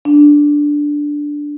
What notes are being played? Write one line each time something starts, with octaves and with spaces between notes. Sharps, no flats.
D4